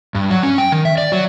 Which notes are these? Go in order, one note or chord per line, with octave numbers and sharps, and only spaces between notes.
G2
F#3
C#4
G5
D#3
E5
D5
F#3